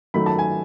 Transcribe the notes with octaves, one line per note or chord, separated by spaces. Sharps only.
D#3 F#3 A3 B5
A5
G#5